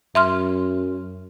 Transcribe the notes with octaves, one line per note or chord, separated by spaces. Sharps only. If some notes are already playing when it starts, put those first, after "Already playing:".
F#2 E5 C6 F6